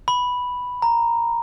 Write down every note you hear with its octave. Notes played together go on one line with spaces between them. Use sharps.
B5
A#5